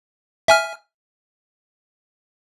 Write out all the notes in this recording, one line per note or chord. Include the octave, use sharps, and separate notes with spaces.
E5 G#5 F6